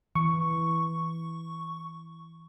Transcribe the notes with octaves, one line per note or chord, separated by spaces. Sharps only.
E3 C#6